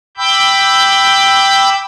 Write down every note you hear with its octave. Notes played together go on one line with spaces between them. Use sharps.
G5 B5 D6 E6 G6